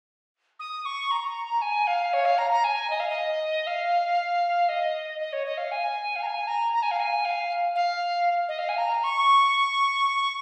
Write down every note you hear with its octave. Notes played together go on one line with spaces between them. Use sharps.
D#6
C#6
A#5
G#5
F5
C#5
F5
A#5
A#5
G#5
D#5
F5
D#5
F5
D#5
D#5
C#5
D#5
F5
G#5
F5
A#5
G#5
A#5
A#5
G#5
F5
G#5
F5
F5
D#5
F5
G#5
A#5
C#6